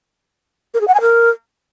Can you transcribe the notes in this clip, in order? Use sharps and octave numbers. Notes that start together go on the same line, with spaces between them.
A#4
G#4
F#5
G#5
A#4